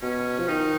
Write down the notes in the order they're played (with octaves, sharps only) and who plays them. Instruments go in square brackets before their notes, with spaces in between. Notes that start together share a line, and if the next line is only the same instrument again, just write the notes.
[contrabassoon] B2 [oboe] C#4
[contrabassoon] F3
[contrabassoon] D#3 [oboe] D#4